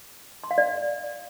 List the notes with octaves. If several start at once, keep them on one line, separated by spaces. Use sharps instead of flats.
C6
F5
D5